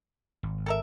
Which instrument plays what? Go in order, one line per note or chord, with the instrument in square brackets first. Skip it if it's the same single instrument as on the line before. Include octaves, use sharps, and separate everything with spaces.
[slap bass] G#1
[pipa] A4 A#4 E5